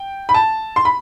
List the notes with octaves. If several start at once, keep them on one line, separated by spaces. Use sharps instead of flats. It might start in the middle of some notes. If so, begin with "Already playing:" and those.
Already playing: G5
B5
A5
C6
B5